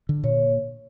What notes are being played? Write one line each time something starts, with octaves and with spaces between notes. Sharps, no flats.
D3
A#2 C#5